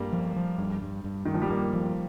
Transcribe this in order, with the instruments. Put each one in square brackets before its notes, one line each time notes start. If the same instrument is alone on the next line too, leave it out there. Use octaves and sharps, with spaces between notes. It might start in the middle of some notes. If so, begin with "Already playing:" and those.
Already playing: [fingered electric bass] G2 [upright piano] G3 A#3
[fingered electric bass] F3
F3
G2
G2
G2
[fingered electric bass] G2 [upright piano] D#3
[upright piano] F3
G3
[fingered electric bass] G2 [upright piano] A#3
[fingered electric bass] F3